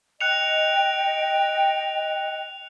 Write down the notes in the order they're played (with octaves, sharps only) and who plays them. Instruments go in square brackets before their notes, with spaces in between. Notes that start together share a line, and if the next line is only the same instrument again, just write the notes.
[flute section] D#5 G5 [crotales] F#6 C#7 F7